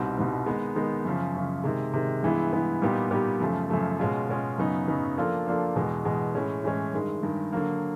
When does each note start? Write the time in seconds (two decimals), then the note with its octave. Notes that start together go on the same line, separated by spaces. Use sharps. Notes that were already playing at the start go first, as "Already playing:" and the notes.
Already playing: C2 B2 G3 C4 D#4
0.16 C2 B2 G3 C4 D#4
0.46 D#3 G#3 B3 D#4
0.76 D#3 G#3 B3 D#4
1.05 F#2 C#3 F3
1.35 F#2 C#3 F3
1.64 C3 D#3 G#3
1.94 C3 D#3 G#3
2.23 G2 E3 G#3 B3 E4
2.52 G2 E3 G#3 B3 E4
2.82 A#2 G3 B3 D#4 G4
3.11 A#2 G3 B3 D#4 G4
3.40 F#2 C#3 F3 A3
3.70 F#2 C#3 F3 A3
3.99 B2 G#3 C#4 F4
4.28 B2 G#3 C#4 F4
4.58 F#2 C#3 F#3 B3 D#4
4.88 F#2 C#3 F#3 B3 D#4
5.17 F3 A#3 D4 F4 A4
5.46 F3 A#3 D4 F4 A4
5.76 E2 B2 G#3
6.05 E2 B2 G#3
6.35 A2 E3 G#3 C#4
6.64 A2 E3 G#3 C#4
6.94 G2 D#3 G#3
7.23 G2 D#3 G#3
7.52 D3 F#3 A#3